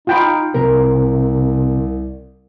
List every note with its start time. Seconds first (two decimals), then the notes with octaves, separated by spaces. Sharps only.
0.07 D#4 F4 G5 B5
0.54 C2 C3 A#4